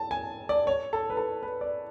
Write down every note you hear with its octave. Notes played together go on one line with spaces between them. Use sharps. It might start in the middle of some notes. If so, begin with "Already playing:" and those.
Already playing: A5
G#5
D5
C#5
A4
B4
A4
B4
D5